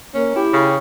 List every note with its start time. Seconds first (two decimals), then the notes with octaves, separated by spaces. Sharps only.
0.14 A#3 C#4
0.35 E4 G4
0.53 C#3